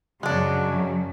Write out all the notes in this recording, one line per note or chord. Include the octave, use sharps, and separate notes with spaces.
F#2 C#3 F#3 G#3 D4